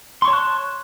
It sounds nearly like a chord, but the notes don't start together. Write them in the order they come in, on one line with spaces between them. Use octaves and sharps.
C6 C#6 C#5 A5 F#6